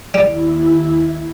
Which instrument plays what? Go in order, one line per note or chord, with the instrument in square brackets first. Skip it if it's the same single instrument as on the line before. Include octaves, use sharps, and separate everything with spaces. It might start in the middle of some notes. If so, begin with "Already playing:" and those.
[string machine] D#2 E4 [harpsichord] G3